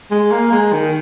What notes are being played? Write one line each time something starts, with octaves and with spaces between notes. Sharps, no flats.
G#3
A#3
G#3
D#3